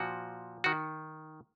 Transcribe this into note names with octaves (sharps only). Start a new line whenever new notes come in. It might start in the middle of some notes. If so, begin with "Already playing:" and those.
Already playing: A#2 F3 F#4
D#3 F#4